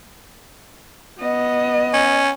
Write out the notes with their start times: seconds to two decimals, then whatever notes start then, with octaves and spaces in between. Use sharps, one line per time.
1.20 B3 D#5
1.93 C#4